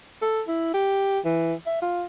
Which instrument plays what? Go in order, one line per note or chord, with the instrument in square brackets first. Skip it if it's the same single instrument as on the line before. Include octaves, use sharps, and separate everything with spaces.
[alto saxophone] A4
E4
G4
E3
E5
F4